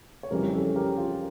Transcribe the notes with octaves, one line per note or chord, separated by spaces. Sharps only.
C#5
F2 C#3 E3 G3 G4 A#4
A4 C#5
G4 A#4
F4